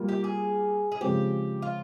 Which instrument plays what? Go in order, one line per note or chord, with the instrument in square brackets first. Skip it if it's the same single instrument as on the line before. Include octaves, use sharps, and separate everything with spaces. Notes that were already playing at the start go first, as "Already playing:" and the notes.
Already playing: [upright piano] G3 A#3 F4
[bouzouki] G4
G#4
G#4
[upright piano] C#3 F3 G#3 C4 [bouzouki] G4
[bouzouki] F4